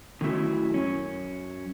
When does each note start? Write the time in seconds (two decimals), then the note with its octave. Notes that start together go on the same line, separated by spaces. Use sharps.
0.21 D3 D#3 F#3 A3 C#4 E4
0.74 F#2 C#4